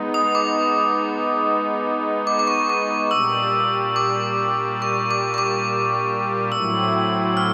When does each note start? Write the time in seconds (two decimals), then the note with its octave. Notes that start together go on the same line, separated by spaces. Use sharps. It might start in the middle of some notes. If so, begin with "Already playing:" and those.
Already playing: G#3 B3 D#4
0.14 D#6
0.35 D6
2.27 D6
2.39 D6
2.47 C#6
2.70 D6
3.11 A#2 G3 A#3 D4 G4 E6
3.96 D6
4.82 C#6
5.11 D6
5.34 C#6
5.38 D6
6.52 A2 F#3 A3 C4 E4 E6
7.37 F6